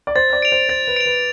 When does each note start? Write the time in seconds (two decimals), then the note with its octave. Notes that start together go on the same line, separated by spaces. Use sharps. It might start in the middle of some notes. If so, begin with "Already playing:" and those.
0.07 D5
0.16 C5 A6
0.33 D5
0.42 D7 F7
0.52 C5
0.69 C5 A6
0.87 B4
0.96 D7 F7
1.06 B4